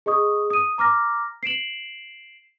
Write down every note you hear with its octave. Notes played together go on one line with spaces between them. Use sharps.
G#4 D#5 C#6 D#6
D#6 D#7
A#5 D6 F6 A#6
C7 D7 E7 F#7